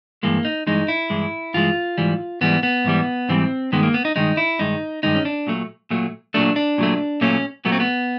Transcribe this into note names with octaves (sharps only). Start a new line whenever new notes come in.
G2 E3 G#3 A#3
D#4
G2 E3 G#3 D#4
E4
G2 E3 G#3
G2 E3 G#3 F4
G#2 E3 G3
G#2 E3 G3 B3
B3
G#2 E3 G3
G#2 E3 G3 C4
G2 D#3 G#3 B3
A#3
B3
D#4
G2 D#3 G#3 D#4
E4
G2 D#3 G#3 D#4
G2 D#3 G#3 D#4
C#4
D4
A#2 F#3 A3
A#2 F#3 A3
A#2 F#3 A3 D4
D4
A#2 F#3 A3
A#2 F#3 A3 C#4
A#2 F#3 A3 B3
C4
B3